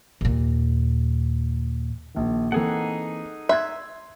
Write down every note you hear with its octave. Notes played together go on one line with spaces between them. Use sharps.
D#2 A#2
A#1 D#3
E3 A#3 C4 D#4 G#4 A4 F#5
E5 C6 F#6 G#6